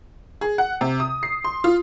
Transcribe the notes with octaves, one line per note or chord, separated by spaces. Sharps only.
G#4
F#5
C3
D#6
C7
C6
F4